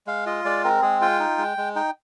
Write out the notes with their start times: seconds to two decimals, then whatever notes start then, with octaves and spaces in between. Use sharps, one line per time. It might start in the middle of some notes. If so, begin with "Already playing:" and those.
0.07 G#3 F5
0.26 F4 D#5
0.45 G#3 D5
0.64 C4 A#4
0.82 G#3 G#4
1.01 F4 G5
1.20 D#4
1.38 G#3
1.58 G#3
1.75 D#4 G5